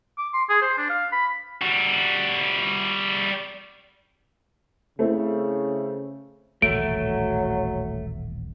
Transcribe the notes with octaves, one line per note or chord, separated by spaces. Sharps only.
D6
C6
G#4
C5
D4
F5
B5
G3 F#4
C#3 A3 C4 E4
D#1 A1 B2 F#3 A3 D7